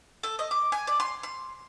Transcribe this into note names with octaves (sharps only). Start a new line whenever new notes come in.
A4
D#5
D6
G#5
D5
C6
C6